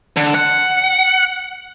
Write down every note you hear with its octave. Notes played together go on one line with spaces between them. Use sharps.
D3
F#5